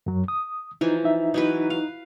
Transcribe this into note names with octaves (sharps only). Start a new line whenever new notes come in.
F#2 F#3
D#6
E3 F3 D#4
D#4 E5
E3 F#3 D#4 B4
F5